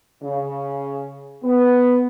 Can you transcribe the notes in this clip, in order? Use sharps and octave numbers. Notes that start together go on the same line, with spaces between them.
C#3
B3